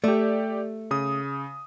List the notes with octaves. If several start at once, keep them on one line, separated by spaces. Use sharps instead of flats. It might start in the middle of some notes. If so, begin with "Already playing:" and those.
A3 G4 D5
C#3 D#6